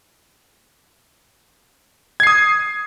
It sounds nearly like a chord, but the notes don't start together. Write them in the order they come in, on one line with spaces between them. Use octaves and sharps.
G#6 C7 D#6